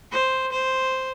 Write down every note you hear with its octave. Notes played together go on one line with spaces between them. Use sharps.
C5
C5